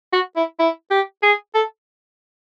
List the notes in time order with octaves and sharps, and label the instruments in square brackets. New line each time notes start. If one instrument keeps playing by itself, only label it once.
[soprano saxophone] F#4
E4
E4
G4
G#4
A4